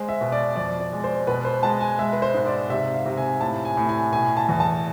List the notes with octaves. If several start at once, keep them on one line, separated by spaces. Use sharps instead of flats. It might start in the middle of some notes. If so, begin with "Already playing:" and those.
Already playing: G#3 C5
E5
B2
D5
F2 D5
D5
G#3
C5
B2 B4
C5
G#3 A5
G#5
G#3 E5
B4
C5
G#2
D5
C3 E5
F5
C3
G#5
A2 A5
G#5
A2
G#5
B2 G#5
A5
E2
A5